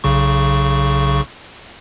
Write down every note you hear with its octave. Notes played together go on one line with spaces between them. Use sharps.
B1 C#3 C#6